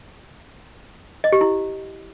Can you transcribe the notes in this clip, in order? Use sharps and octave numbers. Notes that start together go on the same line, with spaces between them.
D#5
G4
E4